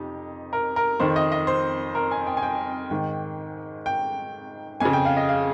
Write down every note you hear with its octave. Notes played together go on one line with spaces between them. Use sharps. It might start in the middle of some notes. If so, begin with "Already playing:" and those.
Already playing: F2 C3 D#4 G4
A#4
A#4
F2 D#3 C5
D#5
D#5
C5
A#4
G#5
G5
G#5
G5
G#2 D#3 G5
G5
F2 C#3 G#5
G5
F5
D#5
F5